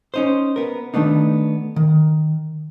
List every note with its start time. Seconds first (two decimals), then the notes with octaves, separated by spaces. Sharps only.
0.14 C#4 D#4 C5
0.56 B3 A#4
0.94 D#3 A3 B3 D4 D#4
1.76 D#3